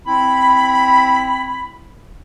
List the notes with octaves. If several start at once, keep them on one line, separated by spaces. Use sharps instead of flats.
C4 E4 B5